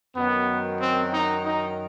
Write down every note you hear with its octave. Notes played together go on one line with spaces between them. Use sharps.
F#2 D#3 F#3 B3
C4
D#4
D#4